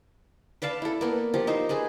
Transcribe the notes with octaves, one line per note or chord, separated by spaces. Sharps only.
B4 D5 F5 A5
E4 A4
A#3 B3
F3 G4
D#4 C5
G#4 B4 C5